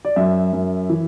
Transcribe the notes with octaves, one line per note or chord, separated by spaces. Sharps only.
D5
F#2 E5
F#2
E3